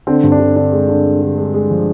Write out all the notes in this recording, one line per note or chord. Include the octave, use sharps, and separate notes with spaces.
D3 C4
G2
D4
D3
D3 D4
G#3
D3
G#3
D3
G#3
G#3
F3